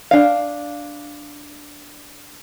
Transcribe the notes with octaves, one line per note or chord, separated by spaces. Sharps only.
D4 F5